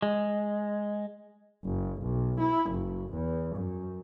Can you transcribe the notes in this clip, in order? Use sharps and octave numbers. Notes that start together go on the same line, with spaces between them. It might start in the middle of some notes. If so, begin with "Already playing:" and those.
G#3
F#1
B1
E4
F#1
E2
F#2